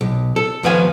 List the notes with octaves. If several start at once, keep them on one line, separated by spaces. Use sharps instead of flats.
B1
A4
D#2 F3 B4 F5 G#5